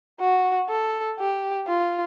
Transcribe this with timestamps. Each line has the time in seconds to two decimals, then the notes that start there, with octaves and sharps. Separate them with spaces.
0.20 F#4
0.69 A4
1.19 G4
1.67 F4